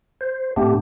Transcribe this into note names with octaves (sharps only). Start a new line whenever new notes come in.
C5
A2 A3 B3 C4 D4 G4